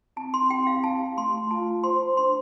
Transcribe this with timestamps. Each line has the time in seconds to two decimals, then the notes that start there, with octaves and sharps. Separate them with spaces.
0.17 C4 A5
0.34 C6
0.50 G4 G5
0.67 F5
0.84 F5 A5
1.17 A3 C6
1.50 F4 A5
1.84 C5 C6
2.17 D4 C6